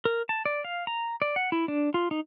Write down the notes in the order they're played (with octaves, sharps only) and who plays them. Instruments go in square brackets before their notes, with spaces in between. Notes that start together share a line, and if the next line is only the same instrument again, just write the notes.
[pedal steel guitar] A#4
A5
D5
F5
A#5
D5
F#5
E4
D4
F4
D#4